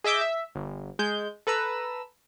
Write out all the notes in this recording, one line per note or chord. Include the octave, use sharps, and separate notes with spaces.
G#4 D#5 E5 D6 G6
E5
G1
G#3 G6
A4 B4 A#5 E6